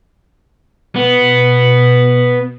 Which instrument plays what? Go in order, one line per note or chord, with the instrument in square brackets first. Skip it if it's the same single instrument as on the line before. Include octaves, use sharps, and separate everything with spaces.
[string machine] B2 [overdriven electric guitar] B3